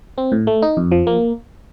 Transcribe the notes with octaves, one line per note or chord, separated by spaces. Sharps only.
C4
A2
A3
D#4
F2
F3
A#3